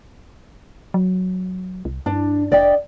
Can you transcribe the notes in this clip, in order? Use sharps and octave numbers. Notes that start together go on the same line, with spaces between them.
F#3
C2
G2 D4
F1 D5 D#5 G5